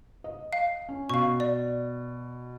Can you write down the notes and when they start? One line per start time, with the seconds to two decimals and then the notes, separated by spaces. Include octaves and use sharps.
0.24 D#5
0.53 F5
0.89 C#4
1.09 B2 F5 C#6
1.40 D5